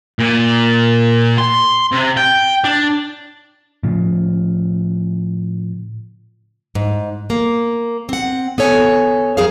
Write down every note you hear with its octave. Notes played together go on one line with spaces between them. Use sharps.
A#2
C6
C3
G5
D4
A2 C#3 F3
G#2
A#3
C4 F#5
B3 A4 C#5 G#5
F2 F#3 G#4 A#4 C5 F5